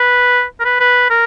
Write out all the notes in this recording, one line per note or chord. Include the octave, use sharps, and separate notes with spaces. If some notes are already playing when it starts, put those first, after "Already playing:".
Already playing: B4
A#4
B4
B4
A#4